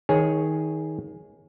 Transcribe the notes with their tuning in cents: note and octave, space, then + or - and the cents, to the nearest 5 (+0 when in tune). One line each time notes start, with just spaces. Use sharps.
D#3 +20 G#4 +0 C#5 +0